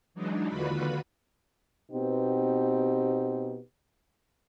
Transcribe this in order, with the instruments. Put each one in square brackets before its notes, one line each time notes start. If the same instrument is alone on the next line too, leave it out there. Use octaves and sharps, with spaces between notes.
[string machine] E3 F#3 G#3 D4 D#4
D#2 D3 F4 F#4 B4 B5
[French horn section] B2 B3 C4 D#4 G4